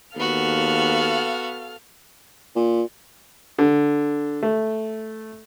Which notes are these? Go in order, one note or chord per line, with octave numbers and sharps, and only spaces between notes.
D#2 B3 F#4 A4 F5 F6
A#2
D3
A3